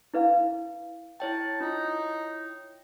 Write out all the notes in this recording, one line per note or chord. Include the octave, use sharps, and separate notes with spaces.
E4 B4 F5
E4 C#5 G5 A5
D#4 F4